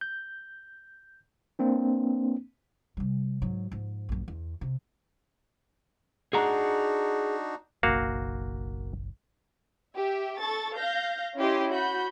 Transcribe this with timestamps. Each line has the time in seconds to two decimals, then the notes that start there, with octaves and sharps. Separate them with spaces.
0.01 G6
1.59 A#3 C4 D4
2.97 C3 G3
3.42 G#2 F#3
3.72 G#2 F3
4.09 A#1 F#2
4.28 E2
4.61 C3
6.33 D4 D#4 F#4 G#4 F#5 A#5
7.83 F#1 B1 A#3 F#4 F5
9.95 G4 E5
10.39 A4 C#6 A6
10.76 F5 G6 A#6
11.38 C#4 E4 G4 D#5 C6
11.71 F#4 B5 G6